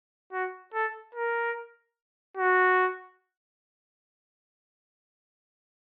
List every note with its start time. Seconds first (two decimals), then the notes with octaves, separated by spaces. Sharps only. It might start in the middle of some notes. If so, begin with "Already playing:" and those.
0.32 F#4
0.74 A4
1.15 A#4
2.37 F#4